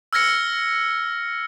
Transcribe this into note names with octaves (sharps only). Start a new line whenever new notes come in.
E6 F6 G#6 A#6 C#7